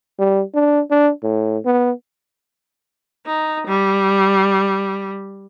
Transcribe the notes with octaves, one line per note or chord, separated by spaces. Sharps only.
G3
D4
D4
A2
B3
D#4
G3